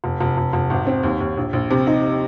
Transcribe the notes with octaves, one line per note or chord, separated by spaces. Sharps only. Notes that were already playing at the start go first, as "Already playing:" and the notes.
F1
F1
F1
F1
G#1
C4
D#2
D#2
A#1
A#1
C3
D#4